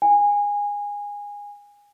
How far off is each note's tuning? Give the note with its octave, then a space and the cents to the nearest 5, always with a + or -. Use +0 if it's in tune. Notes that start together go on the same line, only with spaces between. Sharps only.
G#5 -20